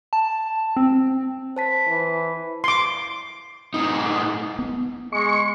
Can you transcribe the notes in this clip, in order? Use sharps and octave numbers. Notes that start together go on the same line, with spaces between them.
A5
C4
C5 A5 B6
E3
C6 D6
A2 D#4
B3
G#3 C#6